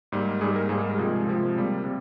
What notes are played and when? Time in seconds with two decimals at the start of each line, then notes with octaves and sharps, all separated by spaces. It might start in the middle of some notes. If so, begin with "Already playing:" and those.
0.12 G#2 G3 A#3
0.41 G#2 G3 A#3 G#4
0.56 A#4
0.69 G#2 G3 A#3 G#4
0.89 A#4
0.98 C3 F3 G#3 G#4
1.27 C3 F3 G#3
1.56 C3 G3 A#3
1.84 C3